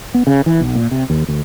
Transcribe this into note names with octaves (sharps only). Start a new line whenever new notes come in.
B3
C#3
E3
B1
A#2
C3
D#2
D2